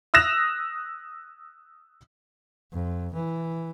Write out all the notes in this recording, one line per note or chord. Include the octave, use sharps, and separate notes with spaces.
D#6 E6 F#6 A#6 E7 F7
F2
E3